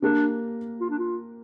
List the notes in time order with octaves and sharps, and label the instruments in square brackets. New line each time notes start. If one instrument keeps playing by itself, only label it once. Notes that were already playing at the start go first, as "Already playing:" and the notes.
[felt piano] A#3 G4 A#4 [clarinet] D4
[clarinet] F4
D4
F4